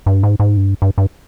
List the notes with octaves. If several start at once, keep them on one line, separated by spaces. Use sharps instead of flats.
G2
G#2
G#2
G2
G2
G2